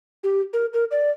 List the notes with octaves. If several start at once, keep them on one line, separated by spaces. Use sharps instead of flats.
G4
A#4
A#4
D5